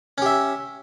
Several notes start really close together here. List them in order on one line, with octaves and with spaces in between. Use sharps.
C#4 G4 E5